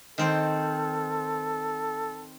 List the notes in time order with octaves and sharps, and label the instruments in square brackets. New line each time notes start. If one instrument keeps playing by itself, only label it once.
[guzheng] D#3 C4 C5 [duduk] A4